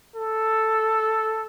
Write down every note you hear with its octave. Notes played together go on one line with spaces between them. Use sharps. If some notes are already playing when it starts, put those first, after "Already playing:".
A4